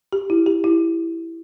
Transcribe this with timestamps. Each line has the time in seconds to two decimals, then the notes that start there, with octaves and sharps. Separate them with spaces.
0.13 G4
0.30 E4
0.46 G4
0.64 E4